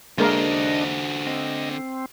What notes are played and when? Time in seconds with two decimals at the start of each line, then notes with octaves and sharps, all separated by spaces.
0.18 D3 G#3 A#3 D4 A#4 C5 D#5
1.26 C4 D#5
1.71 C4